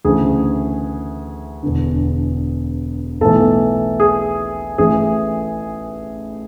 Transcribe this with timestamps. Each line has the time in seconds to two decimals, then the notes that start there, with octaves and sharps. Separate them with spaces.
0.05 D2 C#3 E3 G#4
1.63 E1 E2 D3
3.21 B1 A2 E3 A4
4.00 G#4
4.78 A1 A2 E3 G#4